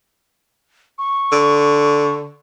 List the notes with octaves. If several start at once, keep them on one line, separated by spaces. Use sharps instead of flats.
C#6
D3